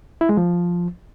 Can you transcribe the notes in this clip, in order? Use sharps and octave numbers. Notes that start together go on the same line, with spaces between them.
E4
G#3
F3